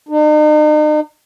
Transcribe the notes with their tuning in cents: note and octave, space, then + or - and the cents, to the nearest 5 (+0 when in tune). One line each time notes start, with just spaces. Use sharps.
D#4 -40